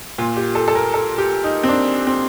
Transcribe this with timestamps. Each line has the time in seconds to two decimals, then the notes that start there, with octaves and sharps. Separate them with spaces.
0.18 A#2 F4
0.36 G4
0.55 A4
0.68 A4
0.75 A#4
0.94 A4
1.18 G4
1.44 D#4
1.63 C4
1.68 D4
2.07 C4